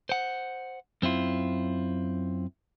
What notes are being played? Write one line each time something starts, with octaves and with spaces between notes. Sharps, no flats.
C5 F#5
F#2 C4 E4 F4